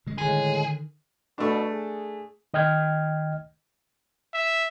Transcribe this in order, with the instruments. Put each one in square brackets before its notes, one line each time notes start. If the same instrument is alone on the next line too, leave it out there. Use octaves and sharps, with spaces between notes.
[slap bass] C#3 G#3
[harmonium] A2 G#3 [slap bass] D3 D#3 [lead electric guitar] G#4
[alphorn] B2 [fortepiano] A3 D4
[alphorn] G#4
[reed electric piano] D#3 D#5 G5 F6 G#6
[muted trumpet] E5